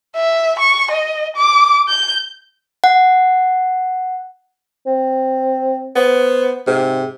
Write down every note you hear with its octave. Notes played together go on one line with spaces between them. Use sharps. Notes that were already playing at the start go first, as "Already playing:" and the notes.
E5
C#6
D#5
D6
G6
F#5
C4
B3 C5
G#2 C3